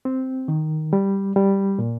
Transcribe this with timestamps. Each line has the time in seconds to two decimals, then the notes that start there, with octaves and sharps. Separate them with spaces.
0.05 C4
0.48 D#3
0.93 G3
1.36 G3
1.79 A#2